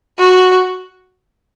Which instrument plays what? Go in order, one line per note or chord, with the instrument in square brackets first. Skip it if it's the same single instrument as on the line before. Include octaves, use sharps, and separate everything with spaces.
[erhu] F#4